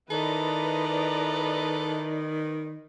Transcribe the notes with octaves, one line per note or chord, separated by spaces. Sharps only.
D#3 E4 A4 B4 D5 D#5 A#5